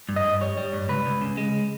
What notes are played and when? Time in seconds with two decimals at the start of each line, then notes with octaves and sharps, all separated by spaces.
0.09 G2
0.16 D#5
0.24 G2
0.41 G3 C#5
0.57 G3
0.74 G2
0.89 C#2 B4
1.06 C#2
1.22 C#3
1.37 G#3